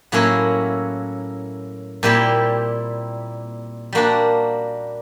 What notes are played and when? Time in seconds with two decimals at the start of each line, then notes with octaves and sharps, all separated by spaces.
0.12 A2 F#3 A#3 C#4 E4
2.03 A#2 G3 C4 E4 G4
3.93 G3 A#3 D4 F#4 A#4